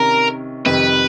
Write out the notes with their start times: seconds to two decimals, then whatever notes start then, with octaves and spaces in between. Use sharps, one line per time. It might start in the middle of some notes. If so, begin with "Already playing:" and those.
Already playing: C3 D#3 C#4 A#4
0.65 F2 C3 D#3 G3 B4